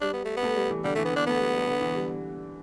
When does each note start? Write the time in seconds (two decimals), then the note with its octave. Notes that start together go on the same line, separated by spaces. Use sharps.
0.01 G3 D4
0.13 B3
0.25 A3
0.37 B3
0.43 A3
0.56 G3
0.70 E3
0.84 D3 G3
0.95 A3
0.98 E3
1.05 B3
1.12 E3 D4
1.26 A3 B3
1.39 G3
1.53 G3
1.67 D3
1.81 E3
1.95 G3